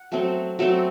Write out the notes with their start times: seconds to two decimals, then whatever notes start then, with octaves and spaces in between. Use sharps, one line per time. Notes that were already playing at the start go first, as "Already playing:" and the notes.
Already playing: F#5
0.12 F#3 A3 C4
0.59 F#3 A3 C4